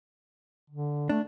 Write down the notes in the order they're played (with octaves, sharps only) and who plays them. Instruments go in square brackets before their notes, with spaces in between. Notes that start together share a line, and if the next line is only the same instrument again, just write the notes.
[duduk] D3
[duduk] A3 [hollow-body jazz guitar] D4